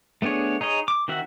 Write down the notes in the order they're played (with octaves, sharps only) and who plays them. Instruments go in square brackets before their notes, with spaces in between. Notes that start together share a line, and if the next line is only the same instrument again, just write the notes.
[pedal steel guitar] A3 B3 D4 G#4 C#5
D#4 G#4 C#5 D#5
D6
D#3 C4 F#4 E5 F#5